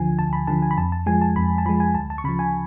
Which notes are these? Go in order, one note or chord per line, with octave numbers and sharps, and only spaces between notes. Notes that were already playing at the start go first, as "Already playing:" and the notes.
Already playing: D2 D3 F3 G#5
D2 A5
B5
D3 F3 A5
G#5
B5
F2 A5
A5
F3 G#3 G#5
A5
F2 B5
A5
F3 G#3 B5
G#5
D2 A5
A5
C#6
C#3 F3 B5
G#5